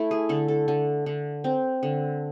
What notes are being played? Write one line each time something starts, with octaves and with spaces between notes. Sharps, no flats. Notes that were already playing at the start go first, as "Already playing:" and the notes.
Already playing: A3 E4
G#4
D3 A4
A4
D3
D3
C4
D3